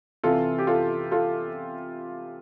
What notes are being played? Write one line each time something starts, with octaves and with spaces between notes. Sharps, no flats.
C3 E3 F4 A4
G4
F4 A4
F4 A4